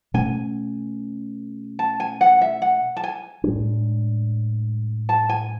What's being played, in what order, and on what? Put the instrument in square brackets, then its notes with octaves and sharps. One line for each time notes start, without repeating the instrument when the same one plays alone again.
[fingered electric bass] B2 A3 C#4 [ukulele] G#5
[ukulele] A5
G#5
F#5
E5
F#5
A5
G#5
[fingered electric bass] A2 G#3 B3 D4
[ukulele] A5
G#5